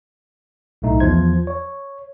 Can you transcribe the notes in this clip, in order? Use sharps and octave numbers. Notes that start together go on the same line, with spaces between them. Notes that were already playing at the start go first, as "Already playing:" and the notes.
B1 A2 A3 D#4
E2 F3 C5 G#6
C#5